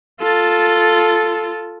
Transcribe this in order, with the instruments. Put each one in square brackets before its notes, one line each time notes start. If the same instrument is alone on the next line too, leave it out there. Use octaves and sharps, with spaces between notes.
[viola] F4 A4